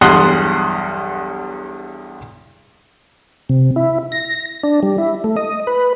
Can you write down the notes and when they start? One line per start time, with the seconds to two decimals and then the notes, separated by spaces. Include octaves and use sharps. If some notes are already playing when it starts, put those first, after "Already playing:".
0.01 B1 E2 G2 F#5 C6 D#6
3.49 C3
3.76 E4
4.12 A#6
4.63 D4
4.83 G3
4.98 E4
5.24 A3
5.37 D#5
5.67 B4